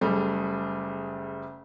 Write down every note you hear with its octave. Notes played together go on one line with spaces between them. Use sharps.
F#1 G3 A3 G#4